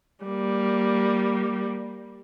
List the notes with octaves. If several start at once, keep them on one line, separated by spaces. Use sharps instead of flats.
G3 A#3